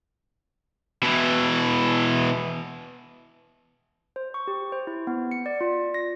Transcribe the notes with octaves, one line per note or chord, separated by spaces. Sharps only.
B2 E3
C5
C#6
G4
C5
E4
B3
C#7
D5
F4
D5
A#6